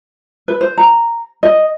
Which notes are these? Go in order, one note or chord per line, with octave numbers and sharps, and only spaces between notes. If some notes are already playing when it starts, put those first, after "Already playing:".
B4
C5
A#5
D#5